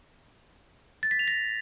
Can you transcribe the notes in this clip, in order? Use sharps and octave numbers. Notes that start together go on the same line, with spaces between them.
A6
B6
F7
A#6